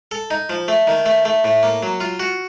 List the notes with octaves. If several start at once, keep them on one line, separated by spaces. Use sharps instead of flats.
A4
D#4
F3
A3
D#3
A3
A3
A2
A#3
F#3
F4
F#4